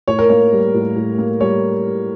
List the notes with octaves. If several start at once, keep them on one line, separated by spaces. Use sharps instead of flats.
A2 C#5
A#4
A#3 C#5
G3
A2
A2
A#3
G3 C#5